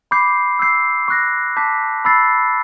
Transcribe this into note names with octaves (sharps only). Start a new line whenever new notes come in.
B5 D6 G6 C7
E6 G6 C7
C#6 F#6 A#6
A5 D6 G6 B6
B5 E6 A6 C7